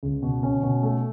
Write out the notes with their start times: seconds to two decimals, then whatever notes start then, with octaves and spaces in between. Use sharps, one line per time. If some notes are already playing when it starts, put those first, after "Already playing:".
0.03 C#2
0.23 B2
0.43 C#4
0.63 B2
0.83 A3